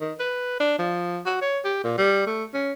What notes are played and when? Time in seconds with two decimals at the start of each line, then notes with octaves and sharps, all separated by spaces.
0.01 D#3
0.20 B4
0.60 D4
0.79 F3
1.26 F#4
1.42 C#5
1.65 G4
1.84 A#2
1.98 G3
2.27 A3
2.54 C#4